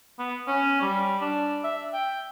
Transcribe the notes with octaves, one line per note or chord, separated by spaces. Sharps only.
B3
C#4
G3
D4
E5
G5